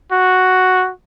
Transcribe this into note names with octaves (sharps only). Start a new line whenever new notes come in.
F#4